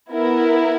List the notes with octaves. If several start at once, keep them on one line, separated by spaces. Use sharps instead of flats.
B3 E4 A#4